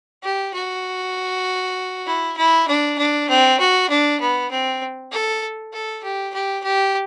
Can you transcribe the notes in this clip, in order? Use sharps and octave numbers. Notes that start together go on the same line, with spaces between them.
G4
F#4
E4
E4
D4
D4
C4
F#4
D4
B3
C4
A4
A4
G4
G4
G4